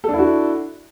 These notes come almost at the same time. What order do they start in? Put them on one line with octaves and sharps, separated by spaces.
A4 D4 E4 F#4